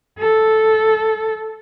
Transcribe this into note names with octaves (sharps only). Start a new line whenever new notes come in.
A4